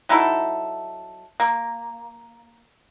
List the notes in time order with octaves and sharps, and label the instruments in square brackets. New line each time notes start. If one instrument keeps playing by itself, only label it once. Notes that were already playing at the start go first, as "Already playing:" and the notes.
[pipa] F#3 D#4 E4 A4
A#3